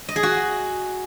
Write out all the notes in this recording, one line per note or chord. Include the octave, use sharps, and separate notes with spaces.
D#5
G#4
F#4